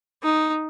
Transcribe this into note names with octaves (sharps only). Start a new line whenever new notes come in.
D#4